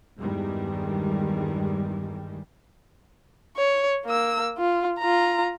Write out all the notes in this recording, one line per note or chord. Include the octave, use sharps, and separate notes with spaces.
E2 G2 D#3 G3 G#3
C#5
A#3 E6
F4
F4 A#5